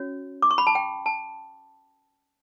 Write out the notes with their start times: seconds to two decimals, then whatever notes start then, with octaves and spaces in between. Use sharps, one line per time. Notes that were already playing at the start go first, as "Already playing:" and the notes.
Already playing: C#4 F#4 C#5
0.42 D6
0.51 C#6
0.58 B5
0.67 A5
0.75 G5
1.06 A5